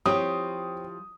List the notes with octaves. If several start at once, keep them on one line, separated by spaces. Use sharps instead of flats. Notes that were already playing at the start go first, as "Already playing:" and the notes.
F3 C4 E4 G4 C#5 D#6